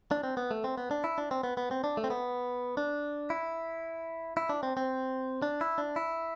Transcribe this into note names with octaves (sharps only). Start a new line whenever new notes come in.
D4
C4
B3
A3
C4
B3
D4
E4
D4
C4
B3
B3
C4
D4
A3
C4
B3
D4
E4
E4
D4
C4
C4
D4
E4
D4
E4